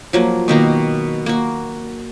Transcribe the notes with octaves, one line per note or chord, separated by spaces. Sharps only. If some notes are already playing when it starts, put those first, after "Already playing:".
F3 F#3 A#3
B2 D#3 A#3 A#5
A#3 F#4